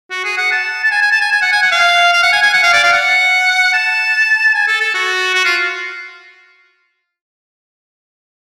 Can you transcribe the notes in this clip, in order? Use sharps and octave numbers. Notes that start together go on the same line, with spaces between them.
F#4
G#4
F#5
A5
A5
G#5
G#5
A5
G#5
G#5
F#5
G#5
F#5
F5
F5
F#5
G#5
G#5
F#5
F5
D5
F5
F#5
A5
G#5
A4
A4
F#4
F#4
F4